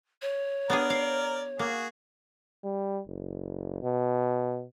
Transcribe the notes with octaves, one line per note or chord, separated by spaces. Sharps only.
C#5
B3 D4 G#4 A#4 D5
F5
A#3 F#4 G#4
G3
F#1
B2